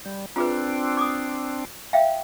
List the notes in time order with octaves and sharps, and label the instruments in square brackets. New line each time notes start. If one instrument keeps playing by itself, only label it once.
[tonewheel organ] G3
[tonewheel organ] C4 D4 [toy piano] F4 G#4 B4
[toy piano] D6 D#6
E5 F5 G5